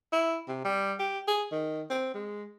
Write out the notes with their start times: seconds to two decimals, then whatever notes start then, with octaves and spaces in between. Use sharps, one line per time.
0.12 E4
0.48 C3
0.65 G3
0.99 G4
1.27 G#4
1.51 D#3
1.90 C4
2.14 G#3